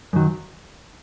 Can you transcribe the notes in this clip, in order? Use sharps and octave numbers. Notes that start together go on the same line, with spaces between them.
F#2 D#3 F#3